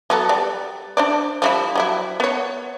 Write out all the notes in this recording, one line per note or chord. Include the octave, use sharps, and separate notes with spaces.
F#3 B3 A4
G3 D5
D4 C5 D5
F3 G3 E4
F#3 G3 E4
B3 C#5